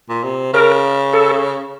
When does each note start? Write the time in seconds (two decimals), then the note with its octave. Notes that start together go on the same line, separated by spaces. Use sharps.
0.09 A#2
0.24 C3
0.54 C#3 A#4
1.13 A4